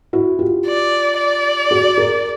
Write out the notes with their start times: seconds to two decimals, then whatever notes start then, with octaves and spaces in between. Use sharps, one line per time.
0.13 E4 F#4
0.39 F4 G4
0.66 D5
1.18 D5
1.71 F#4 G#4
1.98 G#4 A#4